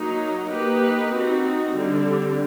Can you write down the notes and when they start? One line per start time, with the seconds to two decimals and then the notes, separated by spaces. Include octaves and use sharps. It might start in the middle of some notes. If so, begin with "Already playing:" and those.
Already playing: F#3 A#3 D#4
0.52 A#3 D#4 G4 B4
1.13 C4 D#4 F#4
1.74 D3 G3 C4